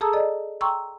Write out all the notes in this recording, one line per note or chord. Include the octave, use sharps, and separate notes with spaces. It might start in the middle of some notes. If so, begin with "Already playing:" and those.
G#4 A4 A5 A#5 D#6 E6
A4 D5 D#5
G5 A#5 C6 C#6 E6